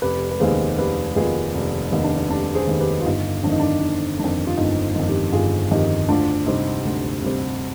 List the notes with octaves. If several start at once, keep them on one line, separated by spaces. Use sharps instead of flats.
F1 G4 B4
B4
D#2 D#3 B3 G#4 C5
F1 G4 B4
D#2 D#3 B3 F4 G#4
F1
D#2 D#3 B3 D#4
D4
D#4
F1 D4
G#4 C5
D#2 D#3 B3
G4 B4
F4
G1 D#4
F2 D#3 D4
D#4
D4
G1 D#4
F2 D#3 D4
F4
G1 D#4
F2 D#3
D#4 G4
G1 F4 G#4
F2 D#3 D#4 G4
D2 D4 F4
C3 G3 C4 D#4
D2
C3 G3 C4